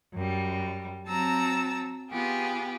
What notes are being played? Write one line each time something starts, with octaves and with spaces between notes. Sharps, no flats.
F#2 G3
F#3 C4 A5 A#5 E6
B3 F4 G4 G#4